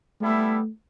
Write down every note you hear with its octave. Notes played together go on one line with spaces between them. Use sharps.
G3 A3 B3 E4 A4 E5